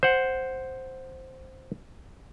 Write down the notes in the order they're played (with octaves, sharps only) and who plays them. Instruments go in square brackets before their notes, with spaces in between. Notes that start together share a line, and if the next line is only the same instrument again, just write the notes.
[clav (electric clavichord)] C5 F#5